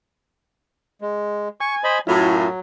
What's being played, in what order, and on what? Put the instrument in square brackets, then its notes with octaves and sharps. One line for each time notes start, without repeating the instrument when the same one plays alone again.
[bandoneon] G#3
[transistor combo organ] G#5 [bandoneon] C#6
[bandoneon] C5 D#5 B5
[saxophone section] F#2 A2 [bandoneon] F#3 [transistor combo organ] E4 F4